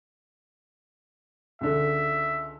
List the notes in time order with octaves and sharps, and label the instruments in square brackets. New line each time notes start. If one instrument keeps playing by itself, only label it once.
[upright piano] C#2 D3 [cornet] E5